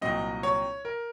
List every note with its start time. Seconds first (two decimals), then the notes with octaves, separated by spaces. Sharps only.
0.01 C2 A#2 F#3 C4 D#5
0.43 C#5
0.85 A#4